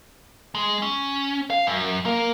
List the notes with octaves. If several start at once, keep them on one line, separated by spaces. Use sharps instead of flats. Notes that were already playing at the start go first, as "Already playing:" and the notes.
G#3
C#4
F5
F#2
A#3